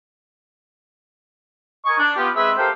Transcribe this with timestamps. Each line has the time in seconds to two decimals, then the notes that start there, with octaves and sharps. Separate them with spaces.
1.85 A#4 D#5 G#5 C#6
1.99 D4
2.17 B3 F4 G4
2.35 G#3 C4 G#4 B4 E5
2.57 G4 A4 A#4 C5 F5 G5